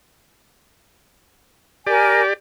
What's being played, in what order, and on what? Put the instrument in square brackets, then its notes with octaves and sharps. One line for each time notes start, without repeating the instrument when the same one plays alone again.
[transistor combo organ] G4 D5 [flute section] A#4 G#5